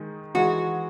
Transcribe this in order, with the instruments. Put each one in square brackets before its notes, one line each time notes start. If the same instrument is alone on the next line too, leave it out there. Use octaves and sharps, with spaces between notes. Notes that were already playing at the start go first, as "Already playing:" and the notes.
Already playing: [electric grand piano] D#3 G#3 D#4
[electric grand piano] E3 G#3 D#4 G#4 [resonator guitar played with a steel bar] F#4